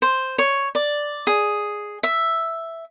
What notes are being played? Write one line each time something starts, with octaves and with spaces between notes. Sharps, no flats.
C5
C#5
D5
G#4
E5